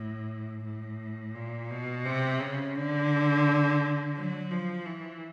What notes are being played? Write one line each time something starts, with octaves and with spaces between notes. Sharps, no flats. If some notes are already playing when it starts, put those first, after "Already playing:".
Already playing: A2
A2
A#2
B2
C3
C#3
D3
F#3
F3
E3